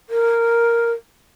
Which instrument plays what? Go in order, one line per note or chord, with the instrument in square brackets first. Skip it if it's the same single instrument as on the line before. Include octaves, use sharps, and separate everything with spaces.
[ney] A#4